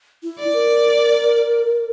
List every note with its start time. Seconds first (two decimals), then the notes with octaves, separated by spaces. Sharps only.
0.23 E4
0.39 D5
0.53 A#4